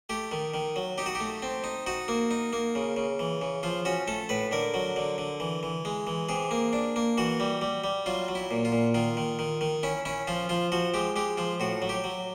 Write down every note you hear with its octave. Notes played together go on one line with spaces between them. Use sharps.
A3 G4
D#3
D#3
F#3
D#4 G4
F#4
G4
A3
C4
D#4
D#4 F#4
A#3
D#4
A#3
C#3
C#3
E3
C#3
F3 F4
C#4 F#4
A3 A4
A2 B4
D3 A#4
F#3
D3
D3
E3
E3
G#3
E3
C3 G#4
A#3
D4
A#3
E3 F#4
G3
G3
G3
F#3 F4
F#3
E4
A#2
F4
A#2
D#3 F4
D#3
D#3
D#3
C#4 E4
C#4 E4
F3 F4
F3 F4
F3 F#4
G#3 G4
G#3 G4
F3 F4
A2 F#4
F#3
G4
F#3